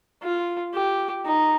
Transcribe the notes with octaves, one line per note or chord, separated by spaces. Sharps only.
F4
G4
D#4